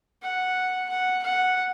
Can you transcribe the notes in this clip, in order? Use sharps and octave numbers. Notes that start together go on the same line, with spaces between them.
F#5
F#5
F#5